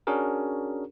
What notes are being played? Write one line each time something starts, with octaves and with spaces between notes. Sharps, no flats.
C#4 D4 F#4 G#4 A#4